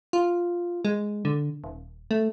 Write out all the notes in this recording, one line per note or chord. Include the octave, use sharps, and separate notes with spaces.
F4
G#3
D3
D#1
A3